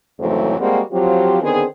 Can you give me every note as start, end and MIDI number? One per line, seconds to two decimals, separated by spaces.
0.19 0.56 41
0.19 0.56 44
0.19 0.56 49
0.19 0.56 52
0.19 0.56 54
0.19 0.56 57
0.59 0.80 55
0.59 0.80 56
0.59 0.80 58
0.59 0.80 60
0.59 0.80 66
0.92 1.39 53
0.92 1.39 54
0.92 1.39 60
0.92 1.39 65
0.92 1.39 67
1.42 1.64 50
1.42 1.64 51
1.42 1.64 59
1.42 1.64 60
1.42 1.64 68